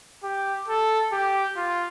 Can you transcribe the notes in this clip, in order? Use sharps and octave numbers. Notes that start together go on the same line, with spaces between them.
G4
A4
G4
F4